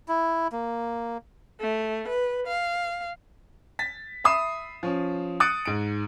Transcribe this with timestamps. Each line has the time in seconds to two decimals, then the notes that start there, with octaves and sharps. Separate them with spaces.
0.08 E4
0.52 A#3
1.61 A3
2.10 B4
2.47 F5
3.79 A6 B6
4.24 E5 B5 D#6 C7 E7
4.83 F3 C#4
5.40 D#6 F#6 A6 C#7 D7
5.65 G#2 D7